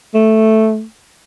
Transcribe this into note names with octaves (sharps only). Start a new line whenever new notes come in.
A3